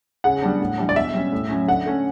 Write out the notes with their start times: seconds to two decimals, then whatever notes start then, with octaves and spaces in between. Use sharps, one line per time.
0.24 C#3 F#5
0.43 G3 B3 D4
0.60 A2
0.78 E3 G3 D4
0.89 D5
0.96 B2 E5
1.14 G3 C#4
1.32 A2
1.50 F#3 C#4
1.68 D3 F#5
1.86 A3 C#4